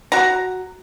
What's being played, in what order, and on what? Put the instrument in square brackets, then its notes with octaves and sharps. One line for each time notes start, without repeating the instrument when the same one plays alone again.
[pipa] F#4 A#5